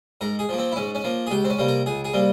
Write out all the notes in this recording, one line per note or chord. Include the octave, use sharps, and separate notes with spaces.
G#2 A#4
G#4
F3 A#3
C4
E4
G#2 C#4
C#4
F3 A#3
G#4
C#2 G4
C4
C#4
C3 G3 A#3
A#4
C#2 G#4
G#4
C3 G3 A#3